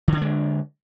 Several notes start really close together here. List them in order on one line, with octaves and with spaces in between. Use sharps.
D#3 D3 D4 G#3